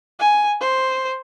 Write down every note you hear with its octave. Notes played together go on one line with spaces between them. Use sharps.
G#5
C5